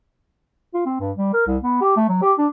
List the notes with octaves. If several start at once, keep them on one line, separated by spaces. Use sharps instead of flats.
F4
C4
G2
G3
A#4
C2
B3
G4
A3
F#3
G4
D4